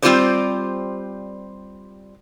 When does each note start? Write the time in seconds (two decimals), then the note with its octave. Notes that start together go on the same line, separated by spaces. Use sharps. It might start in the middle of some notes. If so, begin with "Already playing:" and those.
0.02 G3 C4 F4 G4 C5 D5